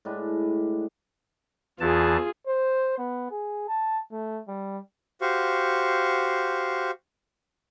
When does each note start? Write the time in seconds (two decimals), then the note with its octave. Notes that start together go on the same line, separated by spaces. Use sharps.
0.05 A2 G#3 D4 B4
1.80 E2 E3 F4 G#4 A5
2.47 C5
2.98 B3
3.31 G#4
3.68 A5
4.12 A3
4.48 G3
5.21 F#4 G4 C5 F5 C#6